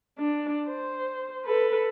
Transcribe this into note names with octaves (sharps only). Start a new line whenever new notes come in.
D4
C5
A4 B4